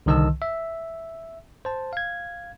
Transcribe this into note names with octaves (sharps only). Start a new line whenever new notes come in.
C2 D3 D#3 D#5 A5 E6
E5
C5 A5
F5 G#6